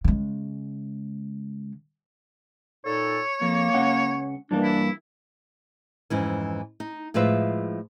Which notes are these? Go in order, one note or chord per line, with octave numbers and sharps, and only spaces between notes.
C#3 G#3
A#2 D#4 A4 C#5
F2 A#3
C#2 C#4 F#5
G2 E3 A#3 D4
E4
F2 G#2 E3 C#4
D#4
A2 F3 G#3 F4 B4 E5